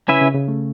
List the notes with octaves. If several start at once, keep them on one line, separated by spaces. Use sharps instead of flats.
C#3 C#4 E4 B4 E5
C#3
C#3
A3 C#4